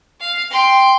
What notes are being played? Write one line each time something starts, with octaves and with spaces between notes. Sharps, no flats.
F5
G5 C6